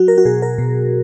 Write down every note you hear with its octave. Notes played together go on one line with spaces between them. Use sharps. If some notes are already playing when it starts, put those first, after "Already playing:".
Already playing: F#3 F#4
A#4
F#4
B2 G#4
A#4
B2